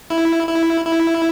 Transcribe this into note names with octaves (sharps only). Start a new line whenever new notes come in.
E4
E4
E4